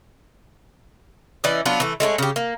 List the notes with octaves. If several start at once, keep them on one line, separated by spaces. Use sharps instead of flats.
E3 C#4 D5 D#5
F#3 B3 D4 F4
E3 A3
G#3 A3 A4 C#5
C#3 G4
A#3